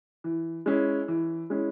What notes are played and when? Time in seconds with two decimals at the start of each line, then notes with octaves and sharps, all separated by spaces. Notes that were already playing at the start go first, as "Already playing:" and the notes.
0.24 E3
0.66 G#3 C#4 E4
1.08 E3
1.50 G#3 C#4 E4